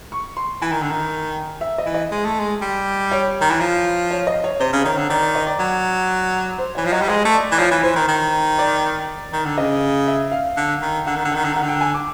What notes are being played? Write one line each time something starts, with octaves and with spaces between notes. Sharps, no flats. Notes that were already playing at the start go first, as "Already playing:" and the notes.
C#6
C6
E3 G#5
D#3
D3
D#3
E5
D#5
E3
D#5
G#3
A3
G#3
G3
C#5
D#3
E3
F3
C#5
D#5
C#5
C3 C5
C#3
D#3 C#5
D3
D#3 D5
D5
D#5
D5
F#3
C5
E3 C#5
F3
F#3 D#5
G3
G#3 D#5
A3
D5
E3
F3 C#5
E3
E3 C5
D#3
D#3
D5
D#3
D3
C#3 D#5
E5
F5
D3
D#3
D3 F#5
D#3
D3
D#3 F#5
D3
D#3 F#5
D3
G5
G#5
D6